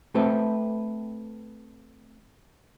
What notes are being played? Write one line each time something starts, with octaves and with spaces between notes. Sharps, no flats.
A3 C4 A4 B4 C5 E5